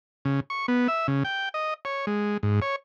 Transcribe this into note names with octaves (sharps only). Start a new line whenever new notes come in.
C#3
C#6
B3
E5
C#3
G5
D#5
C#5
G#3
G#2
C#5